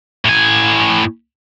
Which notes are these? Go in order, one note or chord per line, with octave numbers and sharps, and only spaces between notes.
A2 G#5